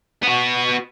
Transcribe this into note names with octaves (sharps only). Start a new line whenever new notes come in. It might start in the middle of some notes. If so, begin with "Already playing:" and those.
B3 F#4